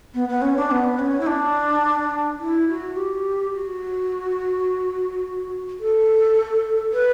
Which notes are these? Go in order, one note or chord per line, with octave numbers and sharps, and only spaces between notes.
B3
B3
C#4
D4
B3
C#4
E4
D4
E4
F#4
G4
F#4
A4
B4